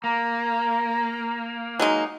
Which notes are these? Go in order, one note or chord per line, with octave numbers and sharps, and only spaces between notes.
A#3 A#5
F#3 G#3 D#4